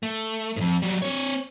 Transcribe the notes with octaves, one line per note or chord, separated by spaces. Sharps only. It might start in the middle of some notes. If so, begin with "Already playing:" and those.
A3
F2 G#2
F#3 G3
C4 C#5